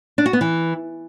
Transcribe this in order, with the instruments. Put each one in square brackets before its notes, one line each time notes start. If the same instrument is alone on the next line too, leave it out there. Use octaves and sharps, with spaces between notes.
[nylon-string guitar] D4
F#4
B3
E3